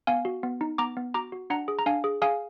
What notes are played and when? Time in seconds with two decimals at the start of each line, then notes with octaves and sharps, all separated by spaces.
0.07 B3 F5 G#5
0.25 F#4
0.43 B3
0.61 D#4
0.78 B3 A#5 D6
0.97 B3
1.14 F#4 A#5 D6
1.32 F#4
1.50 D4 F#5 A#5
1.68 G#4
1.79 A#5
1.86 D4 F5 G#5
2.04 G#4
2.22 G#4 F5 G#5